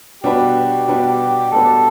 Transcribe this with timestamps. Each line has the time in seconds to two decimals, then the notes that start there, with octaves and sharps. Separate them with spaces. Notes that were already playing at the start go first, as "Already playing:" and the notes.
0.24 B2 G3 D4 F#4 G4 B4
0.88 B2 G3 D4 F#4 B4
1.52 B2 G3 D4 F#4 A4 B4